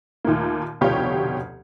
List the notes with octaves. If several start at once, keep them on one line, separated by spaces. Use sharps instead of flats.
D#2 A#2 A3 A#3
F1 D2 B2 F4 G4 C#5